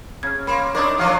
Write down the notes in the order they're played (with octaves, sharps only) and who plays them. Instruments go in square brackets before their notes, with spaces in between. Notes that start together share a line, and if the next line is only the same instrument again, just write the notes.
[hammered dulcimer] C#3 [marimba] F6 G#6
[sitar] A#3 [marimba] B5 C6
[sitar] D4 A#4 [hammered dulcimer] D#4 C#5 D5
[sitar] F3 F#3 [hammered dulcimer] D5 F5